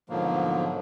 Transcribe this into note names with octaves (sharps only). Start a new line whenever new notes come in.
G#2 B2 D3 F3 F#3 A#3